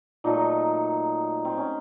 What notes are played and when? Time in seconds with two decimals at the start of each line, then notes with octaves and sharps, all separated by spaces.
0.24 A#2 F#3 A3 D#4
1.45 C4
1.58 C#4